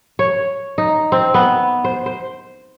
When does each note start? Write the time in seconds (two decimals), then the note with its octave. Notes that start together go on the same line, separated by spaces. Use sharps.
0.19 C#5
0.78 D#4
1.12 C4
1.34 B3
1.84 C5
2.06 C5